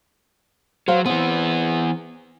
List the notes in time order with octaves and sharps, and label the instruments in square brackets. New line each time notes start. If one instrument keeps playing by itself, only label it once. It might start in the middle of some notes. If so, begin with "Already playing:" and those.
[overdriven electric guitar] F#3 [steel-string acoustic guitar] C5 F5
[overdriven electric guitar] E3 B3 [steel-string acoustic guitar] C4